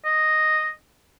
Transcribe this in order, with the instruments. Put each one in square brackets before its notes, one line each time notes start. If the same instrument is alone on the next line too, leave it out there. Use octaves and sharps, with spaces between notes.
[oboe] D#5